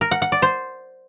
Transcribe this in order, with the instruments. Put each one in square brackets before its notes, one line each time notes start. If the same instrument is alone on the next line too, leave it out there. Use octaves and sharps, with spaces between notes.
[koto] A#4
F#5
F#5
D5
C5